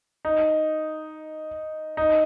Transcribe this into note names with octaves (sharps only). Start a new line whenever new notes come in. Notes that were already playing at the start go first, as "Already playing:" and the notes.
D#4
D#4